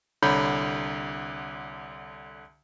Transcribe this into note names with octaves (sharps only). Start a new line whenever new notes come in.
C2 D3 C#5 A#5 B5 G6